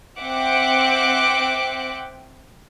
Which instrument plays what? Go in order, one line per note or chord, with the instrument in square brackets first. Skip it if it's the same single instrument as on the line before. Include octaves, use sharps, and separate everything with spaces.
[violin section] C4 E5 F#5 G5 D6 F#6